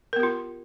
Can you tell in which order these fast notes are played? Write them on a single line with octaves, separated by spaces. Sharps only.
A#4 B3 G4 F4